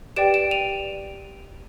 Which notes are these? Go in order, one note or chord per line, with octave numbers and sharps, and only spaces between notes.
G4 B4 D5 G5 D7 E7
D7 E7
D#7 F7